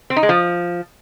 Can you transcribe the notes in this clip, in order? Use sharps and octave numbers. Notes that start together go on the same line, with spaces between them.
C4
D#4
G#3
F3